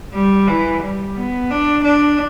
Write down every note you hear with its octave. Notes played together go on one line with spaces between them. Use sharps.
G3
E3
G3
B3
D4
D4